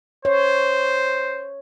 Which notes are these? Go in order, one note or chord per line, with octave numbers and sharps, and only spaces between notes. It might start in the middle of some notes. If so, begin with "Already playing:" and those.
C5 C#5